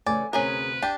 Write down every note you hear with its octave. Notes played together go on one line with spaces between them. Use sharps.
C#3 E3 A3 D5 G#5
D2 C3 C#4 G#4 A#4 B4
D4 G4 G5